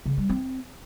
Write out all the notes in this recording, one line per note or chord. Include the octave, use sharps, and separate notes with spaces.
C#3
G3
C4